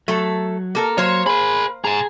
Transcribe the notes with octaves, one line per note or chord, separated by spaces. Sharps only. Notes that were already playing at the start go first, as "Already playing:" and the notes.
F#3 A3 A4
A#3 A4 A#4
F#3 A#3 C5 C#5
G#4 A#4 B5
G#4 G#5 A#5